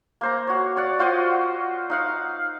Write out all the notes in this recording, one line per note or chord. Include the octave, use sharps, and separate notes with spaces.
A#3 C5 A#5
F#4 C#5
C#5 D5 F#5
F4 F#4 C5 D#5
D#4 F5 F#5